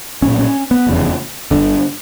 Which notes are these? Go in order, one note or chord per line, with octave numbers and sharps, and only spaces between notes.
B1 A#2 C#4
C#4
B3
F1 E2 C#3
G1 G2 D3